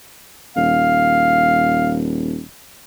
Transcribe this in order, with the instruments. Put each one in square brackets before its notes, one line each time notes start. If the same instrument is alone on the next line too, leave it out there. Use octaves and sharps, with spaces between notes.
[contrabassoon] D#1 [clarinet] F5